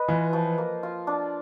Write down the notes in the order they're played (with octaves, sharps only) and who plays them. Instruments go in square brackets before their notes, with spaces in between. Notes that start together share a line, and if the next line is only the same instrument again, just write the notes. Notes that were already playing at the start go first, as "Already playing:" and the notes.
Already playing: [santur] B4 D#5
[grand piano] E3 [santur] F4
[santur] F3
A#3
F4
D4